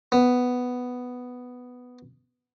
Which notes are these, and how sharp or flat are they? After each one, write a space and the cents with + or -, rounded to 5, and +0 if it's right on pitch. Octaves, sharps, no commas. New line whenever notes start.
B3 +5